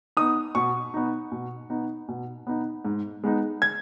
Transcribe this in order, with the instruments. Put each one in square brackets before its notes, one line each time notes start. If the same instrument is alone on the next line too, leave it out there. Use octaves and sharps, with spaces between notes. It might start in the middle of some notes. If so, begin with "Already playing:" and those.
[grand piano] B3 D#4 D#6
B2 C#6
B3 D#4
B2
B3 D#4
B2
B3 D#4
G#2
G#3 B3 D#4
G#6